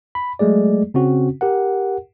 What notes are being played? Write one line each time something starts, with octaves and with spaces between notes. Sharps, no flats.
B5
F#3 G#3 A3 G#4 D5
C#3 C4 C#4 F#4
G4 A#4 F#5